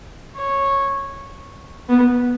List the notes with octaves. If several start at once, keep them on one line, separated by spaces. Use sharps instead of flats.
C#5
B3